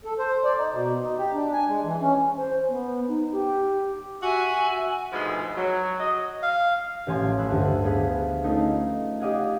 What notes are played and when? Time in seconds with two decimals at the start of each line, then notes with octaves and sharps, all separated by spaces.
0.04 A4
0.19 C5
0.44 D5
0.57 D#4
0.73 B2
1.02 D#4
1.18 G4
1.34 D4
1.53 G#5
1.68 G#3
1.84 E3
2.01 C#4
2.37 C5
2.69 B3
3.08 D#4
3.32 G4
4.22 F#4 E5 G#5
5.13 D2 G#2 B2 F3 G#3 B3
5.57 F#3
5.99 D#5
6.43 F5
7.07 A1 F3 G#5 C6
7.37 A2 A4 B5 E6 F#6
7.51 D2 G2
7.83 G3 B3 G4 G#4 F5 B6
8.44 A3 C#4 D#4 F4
9.20 G4 D5 D#5 F5 F#5 G#5